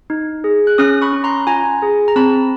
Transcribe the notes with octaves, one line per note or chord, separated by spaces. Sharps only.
D#4
G#4
F#6
C#4 D#6 F6
B5 C#6
C#4
A#5 C6
F4 G#5 A#5
G#4
A#5
C4 A5 B5